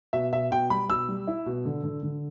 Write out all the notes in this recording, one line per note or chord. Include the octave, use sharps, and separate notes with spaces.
B2 E5
B2 E5
B2 G5
G3 B5
B2 E6
G3
E4
B2
D3
D3
D3